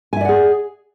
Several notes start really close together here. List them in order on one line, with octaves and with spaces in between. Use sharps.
G#5 E5 D5 F#5 G#4